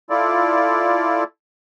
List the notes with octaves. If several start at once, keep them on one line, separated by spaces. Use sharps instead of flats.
E4 F4 A4 D5